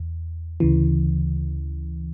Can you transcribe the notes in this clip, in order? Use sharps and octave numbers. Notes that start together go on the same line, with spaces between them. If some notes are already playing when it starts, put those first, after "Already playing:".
Already playing: E2
D2 C#3 E3